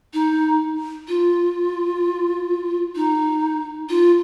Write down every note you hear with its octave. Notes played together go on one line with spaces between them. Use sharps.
D#4
F4
D#4
F4